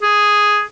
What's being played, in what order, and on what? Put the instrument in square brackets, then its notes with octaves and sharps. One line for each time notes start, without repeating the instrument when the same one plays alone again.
[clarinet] G#4